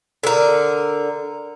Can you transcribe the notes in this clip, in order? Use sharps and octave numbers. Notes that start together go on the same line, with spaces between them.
D3 A#4